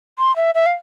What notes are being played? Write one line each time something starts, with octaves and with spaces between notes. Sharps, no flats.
C6
E5
E5
F5